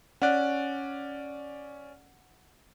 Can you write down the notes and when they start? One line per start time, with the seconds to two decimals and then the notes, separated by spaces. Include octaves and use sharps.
0.22 C#4 D5 F#5 F#6